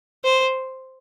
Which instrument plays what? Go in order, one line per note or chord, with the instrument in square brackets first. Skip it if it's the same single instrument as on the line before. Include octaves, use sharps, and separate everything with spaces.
[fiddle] C5